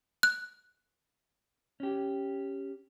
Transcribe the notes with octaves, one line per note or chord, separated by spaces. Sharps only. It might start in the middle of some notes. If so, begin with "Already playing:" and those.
F#6
C#4 G4